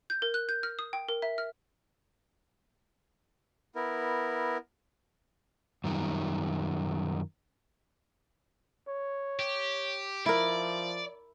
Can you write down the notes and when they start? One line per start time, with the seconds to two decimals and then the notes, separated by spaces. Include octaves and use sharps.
0.10 G6
0.22 A#4
0.34 F#6
0.49 G6
0.63 F6
0.79 D#6
0.93 G5
1.09 A#4
1.22 E5
1.38 F6
3.75 B3 E4 A#4
5.84 F#2 D#3 G3
8.88 C#5
9.40 G4
10.26 F3 E4 A#4 D5